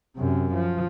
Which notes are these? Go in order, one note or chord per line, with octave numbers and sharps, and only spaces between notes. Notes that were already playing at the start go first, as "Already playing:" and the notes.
F#2 C3
F3